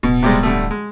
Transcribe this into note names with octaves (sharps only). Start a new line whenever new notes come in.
D1 B2
C3 G3 G#3
D3 G3 A3
G#3